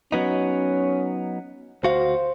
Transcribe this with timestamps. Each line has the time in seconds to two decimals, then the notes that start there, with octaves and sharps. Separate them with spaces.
0.12 F#3 B3 C#4 D#4
1.84 D2 F#4 C5 F5